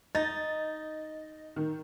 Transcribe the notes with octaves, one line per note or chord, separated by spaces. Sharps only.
D#4 D#5 A6
D#3